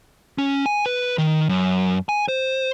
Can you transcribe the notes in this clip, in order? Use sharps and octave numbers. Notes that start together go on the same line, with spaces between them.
C#4
G#5
B4
D#3
F#2
G#5
C5